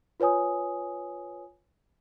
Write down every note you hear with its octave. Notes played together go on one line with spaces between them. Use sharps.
F4 B4 C#5 G#5 D#6